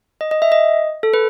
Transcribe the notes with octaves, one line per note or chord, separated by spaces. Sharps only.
D#5
D#5
E5
D#5
A4
B4